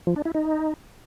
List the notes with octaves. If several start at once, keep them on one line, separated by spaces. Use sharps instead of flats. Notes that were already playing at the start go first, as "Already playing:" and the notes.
F3
D4
E4
D#4